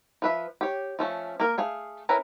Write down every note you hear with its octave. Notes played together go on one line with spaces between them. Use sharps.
F3 B4 E5
G4 C#5
F3 A3 C#4
A#3 A#4
A3 G#4 F5
C#4 E4 A#4 B4